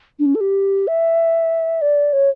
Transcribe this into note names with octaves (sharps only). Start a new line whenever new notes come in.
D4
C#4
A4
G4
E5
D5
C#5